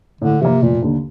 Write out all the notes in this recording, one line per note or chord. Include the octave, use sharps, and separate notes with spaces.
A2 D3
C3 F3 A#3
F1 A#2
D#2 D3